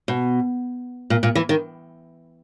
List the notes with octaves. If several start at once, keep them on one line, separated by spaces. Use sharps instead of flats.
B2
A#2
A#2
E3
D#3